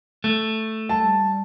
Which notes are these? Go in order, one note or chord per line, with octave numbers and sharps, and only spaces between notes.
A3
G3 A5